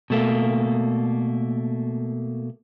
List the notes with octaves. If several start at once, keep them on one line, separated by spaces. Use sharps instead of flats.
B2 A3 A#3